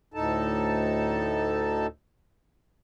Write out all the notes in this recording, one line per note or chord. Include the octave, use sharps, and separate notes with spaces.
D2 A2 D#4 A4 A5